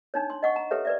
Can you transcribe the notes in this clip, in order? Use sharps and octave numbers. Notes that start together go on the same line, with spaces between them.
D4 D#4 C#5
C6
D#5 F#5 C#6
A#5
G4 A4 B4 C#5 E5
B4 D5 E5